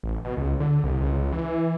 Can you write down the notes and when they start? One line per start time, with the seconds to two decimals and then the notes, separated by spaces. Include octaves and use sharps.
0.03 A1
0.25 B2
0.37 C#2
0.60 D3
0.84 C2
1.01 C#2
1.32 E3